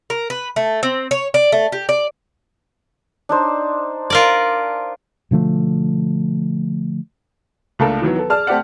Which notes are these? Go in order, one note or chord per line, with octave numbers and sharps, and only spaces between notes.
A#4
B4
A3
C4
C#5
D5
A3
G4
D5
D4 D#4 C5
F4 A#4 D5
B2 D3 F3 A3
C#2 A3 A#3 D4 A4 A#4
D#3 E3 F#3 B3
B3 A4
G#4 D5 A5 F6
A3 C4 G4 D5 F#5